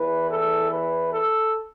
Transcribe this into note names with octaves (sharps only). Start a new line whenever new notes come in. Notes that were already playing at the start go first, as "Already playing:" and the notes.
Already playing: E2 E3 B4
A4
B4
A4